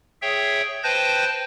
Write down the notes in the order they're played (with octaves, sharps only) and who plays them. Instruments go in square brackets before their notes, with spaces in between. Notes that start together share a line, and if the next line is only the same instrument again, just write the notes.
[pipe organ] G#4 C#5 E5 G5
B4 C5 G5 A5 G6 A#6